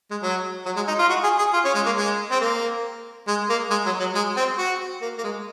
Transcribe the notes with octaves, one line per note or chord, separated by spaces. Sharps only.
G#3
F#3
F#3
G#3
D#4
F4
F#4
G#4
G#4
F4
C#4
G#3
A#3
G#3
C4
A#3
G#3
A#3
G#3
F#3
F#3
G#3
C4
F#4
A#3
A#3
G#3